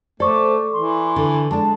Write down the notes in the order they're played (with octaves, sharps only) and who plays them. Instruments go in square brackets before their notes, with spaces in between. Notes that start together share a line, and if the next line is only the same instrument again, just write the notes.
[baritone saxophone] A3 [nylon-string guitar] A4 [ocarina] C5 [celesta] D5 C#6 D6
[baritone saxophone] E3 [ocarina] C6
[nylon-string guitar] D3
[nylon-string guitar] G#3 D4 [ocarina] A5